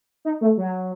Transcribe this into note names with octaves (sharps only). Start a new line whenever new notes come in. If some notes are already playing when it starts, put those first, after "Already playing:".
D#4
A3
F#3